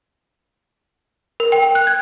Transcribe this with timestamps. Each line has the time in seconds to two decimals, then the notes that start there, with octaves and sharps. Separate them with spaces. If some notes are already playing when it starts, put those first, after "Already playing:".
1.40 A#4
1.52 G5
1.75 F#6
1.87 G#6